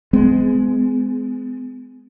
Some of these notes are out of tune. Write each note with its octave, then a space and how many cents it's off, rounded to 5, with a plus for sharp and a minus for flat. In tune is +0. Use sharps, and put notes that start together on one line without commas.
G#3 +10 B3 +45